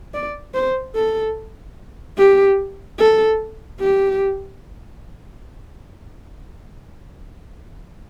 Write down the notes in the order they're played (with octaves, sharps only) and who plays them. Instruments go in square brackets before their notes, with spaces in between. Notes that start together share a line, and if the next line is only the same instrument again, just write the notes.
[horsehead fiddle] D5
C5
A4
G4
A4
G4